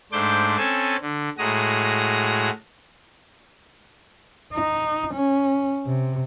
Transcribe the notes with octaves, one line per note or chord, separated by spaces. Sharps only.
G#2 A3 D4 C5 D6 G6
C4 C#4 A4 G#5 A5
D3
A2 G#3 F#4 A#5 D#6
D#4
C#4
C3